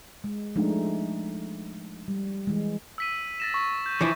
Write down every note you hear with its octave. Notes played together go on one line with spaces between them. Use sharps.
G#3
F3 G#3 A3 D4 D#4
G3
E3 G#3
E6 B6 D#7
A6 A#6 E7
C#6
G6
E3 F3 E4